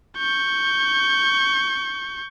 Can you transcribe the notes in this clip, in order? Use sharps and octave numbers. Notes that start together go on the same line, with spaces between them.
C#6 G6